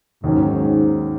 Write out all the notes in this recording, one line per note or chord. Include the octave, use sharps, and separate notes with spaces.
D#2 G#2 D#3 F#3 C#4